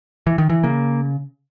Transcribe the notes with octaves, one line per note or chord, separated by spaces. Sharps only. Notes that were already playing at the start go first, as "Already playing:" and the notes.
E3
D#3
E3
C#3 A#3